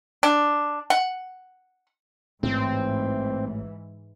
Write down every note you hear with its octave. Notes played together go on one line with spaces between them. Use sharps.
D4
F#5
A1 G#2 E3 C4